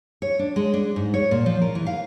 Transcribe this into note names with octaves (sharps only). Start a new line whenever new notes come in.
C#5
D4
G#3
D4
G#2
C#5
A#2
F3
A#4
E3
F5